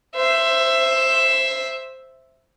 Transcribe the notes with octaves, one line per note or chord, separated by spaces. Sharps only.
C5 E5